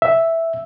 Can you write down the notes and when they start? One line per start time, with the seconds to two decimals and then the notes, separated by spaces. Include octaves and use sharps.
0.02 E5